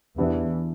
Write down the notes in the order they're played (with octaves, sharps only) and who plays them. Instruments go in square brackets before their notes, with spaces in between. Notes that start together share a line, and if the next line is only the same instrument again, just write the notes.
[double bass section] E2 E3 [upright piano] B3 D4 G4 B4 D5